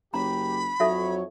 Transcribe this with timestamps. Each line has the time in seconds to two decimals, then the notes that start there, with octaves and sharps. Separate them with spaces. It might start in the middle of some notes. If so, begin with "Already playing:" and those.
0.14 F#1 C#4 G4 A#5 B5
0.80 F2 F#3 D#4 A4 C#5 E5